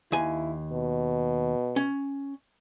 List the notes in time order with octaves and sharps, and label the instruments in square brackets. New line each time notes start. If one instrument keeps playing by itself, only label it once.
[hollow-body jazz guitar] D#2 G#5 [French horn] E4
[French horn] B2
[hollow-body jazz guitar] C#4